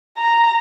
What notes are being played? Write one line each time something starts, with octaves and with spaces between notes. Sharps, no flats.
A#5